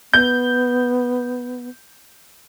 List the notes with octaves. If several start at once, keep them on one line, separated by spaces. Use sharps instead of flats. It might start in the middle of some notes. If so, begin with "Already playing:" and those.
B3 G6